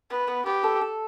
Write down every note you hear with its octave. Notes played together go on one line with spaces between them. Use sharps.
B3 B4
B3
B3 G4
A4
A4